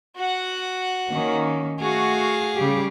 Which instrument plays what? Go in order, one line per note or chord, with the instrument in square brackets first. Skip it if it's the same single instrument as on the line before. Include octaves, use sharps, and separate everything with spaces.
[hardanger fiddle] F#4 F#5
[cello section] D#3 A#3 C#4
[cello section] A3 F#4 [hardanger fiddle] G#4 F5
[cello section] C#3 G3 G4